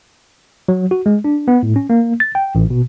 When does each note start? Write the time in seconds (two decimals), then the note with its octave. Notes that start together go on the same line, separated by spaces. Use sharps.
0.68 F#3
0.91 F#4
1.06 G#3
1.24 D4
1.48 B3
1.63 A2
1.76 C#4
1.90 A#3
2.20 A6
2.35 G5
2.55 A1
2.70 B2